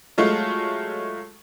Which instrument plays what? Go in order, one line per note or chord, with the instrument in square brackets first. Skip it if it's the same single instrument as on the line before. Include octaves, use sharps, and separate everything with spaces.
[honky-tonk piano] F#3 G#3 A3 F4